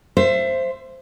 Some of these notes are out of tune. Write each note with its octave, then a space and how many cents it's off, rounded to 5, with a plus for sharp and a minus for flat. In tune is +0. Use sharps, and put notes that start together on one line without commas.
C5 +0 E5 +30